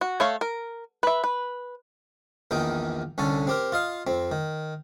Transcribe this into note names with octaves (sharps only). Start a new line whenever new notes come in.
F#4
A3 C#5 F5
A#4
B4 E5
B4
A#1 E2 D#3 D#4 G5
C2 D3 C#4 A4
C4 G4 A#4
F4 D#5 F5
F2 C4
D#3